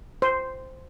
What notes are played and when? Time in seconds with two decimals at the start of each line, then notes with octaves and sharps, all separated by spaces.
0.22 C5